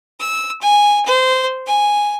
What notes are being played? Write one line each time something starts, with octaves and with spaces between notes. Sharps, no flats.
E6
G#5
C5
G#5